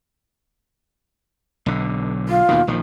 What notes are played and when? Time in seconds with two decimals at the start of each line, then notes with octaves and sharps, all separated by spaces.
1.66 B1 D3
2.28 F4
2.49 D#2 B2 D#3
2.67 A#1 D#3 F3